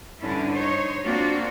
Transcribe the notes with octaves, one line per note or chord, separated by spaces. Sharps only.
G2 D3 C#4 D4 E4
D#4 C5 C#5
A#3 C4 D4 F4 F#4